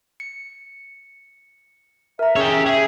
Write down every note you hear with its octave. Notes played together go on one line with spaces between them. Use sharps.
C#7
A#4 E5 A#5
C#4 G4 G#4 C#5 E6
G#4 E5